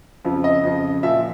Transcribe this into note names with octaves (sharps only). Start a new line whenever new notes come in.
F2 C#3 F3
D#5
F2 C#3 F3
A#2 F3 E5